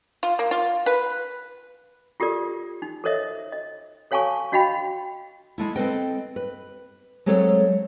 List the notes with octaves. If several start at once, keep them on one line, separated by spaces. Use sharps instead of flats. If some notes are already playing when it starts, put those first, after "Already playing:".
F4
A#3
F4
B4
F4 G4 A4 A#4 D5
D#4
A4 A#4 C5 C#5 D#5 E5
D#5
A4 C#5 F5 G#5 A5 C#6
D4 F#4 D#5 F5 G5 B5
G#3 A3 E4
C4 E4 A4 B4 D#5 G5
B4
F#3 G#3 A3 C4 A4 C#5